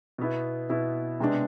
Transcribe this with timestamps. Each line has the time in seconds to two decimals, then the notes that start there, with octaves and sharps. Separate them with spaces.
0.18 B2 B3 E4
0.70 B2 B3 E4
1.20 C3 G#3 B3 D4